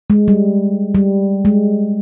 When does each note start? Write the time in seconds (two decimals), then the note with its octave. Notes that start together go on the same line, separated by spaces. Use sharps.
0.10 G#3
0.28 G3
0.95 G3
1.45 G#3